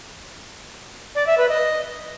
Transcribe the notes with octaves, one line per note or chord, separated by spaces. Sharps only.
D5
E5
B4
D#5